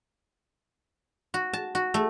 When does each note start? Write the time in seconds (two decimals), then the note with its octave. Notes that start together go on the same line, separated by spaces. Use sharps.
1.34 F#4
1.53 A5
1.75 F#4
1.94 A3